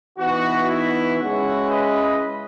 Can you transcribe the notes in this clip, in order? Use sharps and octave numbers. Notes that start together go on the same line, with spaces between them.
E3 B3 D#4 F#4
E4
C#3 G#3 C#4 E4 F#4
B4 D#5